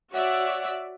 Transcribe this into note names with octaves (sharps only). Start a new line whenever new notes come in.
F#4 C#5 D5 E5 F#5